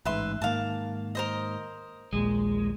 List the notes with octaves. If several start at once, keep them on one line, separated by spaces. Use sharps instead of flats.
A1 G#2 B4 E5 C6
G#2 D#3 A#3 F5 A5
A#4 C5 D#5
A#1 D#2 A#2 G#3